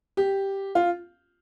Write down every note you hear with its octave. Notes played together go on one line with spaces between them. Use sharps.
G4
F4